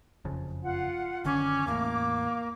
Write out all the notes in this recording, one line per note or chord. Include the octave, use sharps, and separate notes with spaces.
F#1 F2 C#3
F4 F#5
F#1 D3 D#3 C#4 D6
E2 A2 A#3